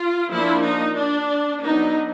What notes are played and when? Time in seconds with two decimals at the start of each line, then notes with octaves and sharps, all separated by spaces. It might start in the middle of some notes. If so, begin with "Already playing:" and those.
Already playing: F4
0.32 F3 A#3 D4 E4
0.65 D#4
0.98 D4
1.64 F#3 B3 D4 D#4